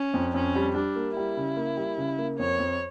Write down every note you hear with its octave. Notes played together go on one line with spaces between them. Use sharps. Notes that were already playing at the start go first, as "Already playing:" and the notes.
Already playing: C#4
F2
F2 C#4
G3
G3 D4
A#3
G3 E4
C#3
A#3
G3
C#3
A#3
F2 C#5
F2